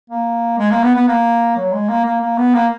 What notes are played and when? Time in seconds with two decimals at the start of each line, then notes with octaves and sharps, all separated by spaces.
0.10 A#3
0.58 G#3
0.71 A#3
0.83 B3
0.95 B3
1.08 A#3
1.56 F#3
1.72 G#3
1.89 A#3
2.05 A#3
2.21 A#3
2.38 B3
2.54 A#3